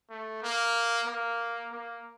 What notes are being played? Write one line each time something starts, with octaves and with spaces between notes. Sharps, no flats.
A3
A#3
A#3
A#3